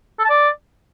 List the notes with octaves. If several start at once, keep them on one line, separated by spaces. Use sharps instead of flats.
A4
A5
D5